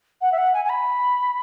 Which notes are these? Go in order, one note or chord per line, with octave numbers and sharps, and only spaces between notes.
F#5
E5
F#5
G#5
G#5
B5